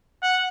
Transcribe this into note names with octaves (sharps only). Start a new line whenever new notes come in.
F#5